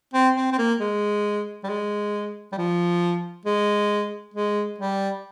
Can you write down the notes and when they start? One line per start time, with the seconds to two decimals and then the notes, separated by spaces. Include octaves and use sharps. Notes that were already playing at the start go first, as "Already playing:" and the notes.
0.14 C4
0.36 C4
0.52 C4
0.59 A#3
0.80 G#3
1.64 G3
1.69 G#3
2.53 G3
2.58 F3
3.45 G#3
4.34 G#3
4.79 G3